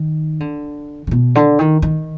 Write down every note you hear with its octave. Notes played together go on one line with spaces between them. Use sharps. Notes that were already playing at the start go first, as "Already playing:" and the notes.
Already playing: D#3
D3
D3
B2
D3
D#3
D#3